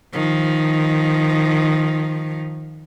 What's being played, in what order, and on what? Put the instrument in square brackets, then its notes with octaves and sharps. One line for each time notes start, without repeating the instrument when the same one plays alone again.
[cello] D#3 F3